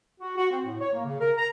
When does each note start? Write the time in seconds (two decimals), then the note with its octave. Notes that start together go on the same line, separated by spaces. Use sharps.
0.21 F#4
0.37 F#4
0.50 C4
0.65 A2
0.81 C#5
0.93 A#3
1.05 C#3
1.20 A#4
1.38 A#5